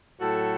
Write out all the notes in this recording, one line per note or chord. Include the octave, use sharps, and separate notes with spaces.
A2 F#3 F#4 A4